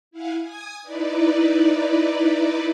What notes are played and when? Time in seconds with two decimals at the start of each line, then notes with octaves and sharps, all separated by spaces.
0.11 E4 F5 F#5 G#5
0.41 G#5 D#6 G#6
0.82 D#4 E4 B4 D5